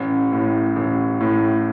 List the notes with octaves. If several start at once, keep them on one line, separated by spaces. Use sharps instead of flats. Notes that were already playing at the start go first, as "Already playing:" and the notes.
Already playing: A1
A2
A1
A2